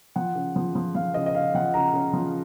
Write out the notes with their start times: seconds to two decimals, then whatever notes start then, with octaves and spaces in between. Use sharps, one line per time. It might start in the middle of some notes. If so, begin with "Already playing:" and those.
0.16 F3 F#5
0.36 C#3
0.56 F3
0.75 F3
0.95 F3 F5
1.14 C#3 D#5
1.26 D#5
1.35 C#3 F5
1.54 F3 F#5
1.74 C#3 A#5
1.94 C#3
2.13 F3